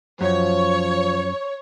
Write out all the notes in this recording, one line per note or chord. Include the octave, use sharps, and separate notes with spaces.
F#2 F3 C#5